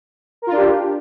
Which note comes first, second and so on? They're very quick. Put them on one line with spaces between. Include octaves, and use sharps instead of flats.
A#4 F4 D4 G4